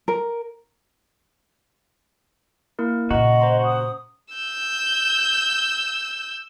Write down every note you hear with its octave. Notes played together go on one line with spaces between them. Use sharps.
A#4
A#3 E4 A#4
A#2 C#3 F#4 D#5 A#5
C5 A#5 C6
D#6
E6 G6